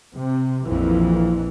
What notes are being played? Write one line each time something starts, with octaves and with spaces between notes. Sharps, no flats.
C3
A#1 F2 E3